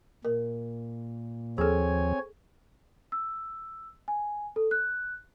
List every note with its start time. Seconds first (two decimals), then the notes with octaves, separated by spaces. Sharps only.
0.25 A#2 A#4
1.58 D#2 F3 C4 G#4 A4 C#5 G#5
3.12 E6
4.08 G#5
4.56 A4
4.71 F#6